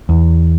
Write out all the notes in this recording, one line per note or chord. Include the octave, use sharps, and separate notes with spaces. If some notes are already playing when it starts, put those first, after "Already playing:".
E2